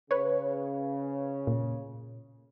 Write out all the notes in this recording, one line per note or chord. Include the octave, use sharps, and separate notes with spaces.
C#3 B4 C#5
A#2